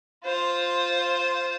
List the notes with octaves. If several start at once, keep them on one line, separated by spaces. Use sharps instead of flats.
F4 C5